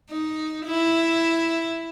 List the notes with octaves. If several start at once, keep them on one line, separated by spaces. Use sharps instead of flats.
D#4
E4